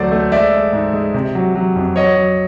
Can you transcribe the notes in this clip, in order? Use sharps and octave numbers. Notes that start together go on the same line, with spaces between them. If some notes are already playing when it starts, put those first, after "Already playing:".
Already playing: D2 F#3 A3 C5 D5
A3
G#3 D5 E5
G#3
G#2
G#3
C3
F#3
F#3
F2
F#3 C#5 D#5
F#3